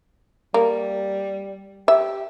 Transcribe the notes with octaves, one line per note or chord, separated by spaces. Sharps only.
G3 A#3
G4 E5